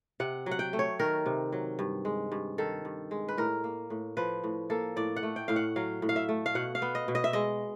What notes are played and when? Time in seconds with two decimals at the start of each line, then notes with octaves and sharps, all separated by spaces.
0.20 C3 F#5
0.46 F#3
0.51 F#5
0.59 G5
0.73 A3
0.79 C#5
0.99 D#3 A#4
1.26 C3
1.53 F#3
1.79 G2
2.05 G#3
2.32 G2
2.58 D#3 A4
2.85 G2
3.11 G#3
3.28 B4
3.38 A2 A#4
3.64 A#3
3.90 A2
4.17 F3 B4
4.44 A2
4.70 A#3 A4
4.96 A2 D5
5.16 F#5
5.23 A3
5.36 G5
5.48 A2 F5
5.56 F#5
5.76 F#3 F5
6.02 A2
6.09 F5
6.16 E5
6.29 A3
6.46 F5
6.55 B2 F#5
6.75 F5
6.82 B3
6.95 D#5
7.08 B2
7.15 D#5
7.24 E5
7.33 G#3 D#5